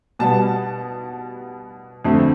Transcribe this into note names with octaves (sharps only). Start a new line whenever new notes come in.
B2 G3 B3 A5
F2 D3 A3 C4